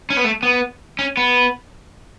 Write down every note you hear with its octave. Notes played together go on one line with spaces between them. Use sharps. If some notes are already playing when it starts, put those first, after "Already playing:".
C#4
B3
A3
B3
C#4
B3